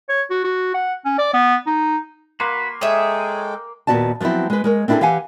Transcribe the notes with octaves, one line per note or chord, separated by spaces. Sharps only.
C#5
F#4
F#4
F#5
C#4
D5
B3
D#4
A#3 F#4 B4 C6
G#3 G#4 A4 C#5 E5 G5
D#2 A#2 B3 F#4 D5 A5
F3 F#3 B3 C4 E4
G#3 B4
G#3 A#4 C#5
C4 D4 E4 F4 G#4 A4
E3 G4 F5 F#5 G#5